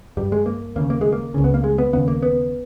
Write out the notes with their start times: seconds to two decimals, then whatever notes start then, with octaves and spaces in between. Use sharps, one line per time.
0.17 G2 G3
0.32 G#3
0.46 A#3
0.75 D#2 C#3 A#3
0.90 A#3
1.01 G#3
1.13 A#3
1.34 C#2 C#3
1.44 B3
1.54 A#3
1.64 G#3
1.78 B3
1.93 D#2 C#3 B3
2.08 A#3
2.23 B3